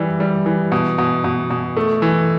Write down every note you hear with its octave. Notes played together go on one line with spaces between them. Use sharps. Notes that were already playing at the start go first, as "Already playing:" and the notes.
Already playing: E3 G3
G3
E3
B2
B2
B2
B2
A3
E3